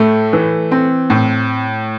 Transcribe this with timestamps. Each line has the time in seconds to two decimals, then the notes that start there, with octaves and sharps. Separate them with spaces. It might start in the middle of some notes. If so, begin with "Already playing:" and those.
Already playing: A2 A3
0.33 E3
0.71 C4
1.10 A2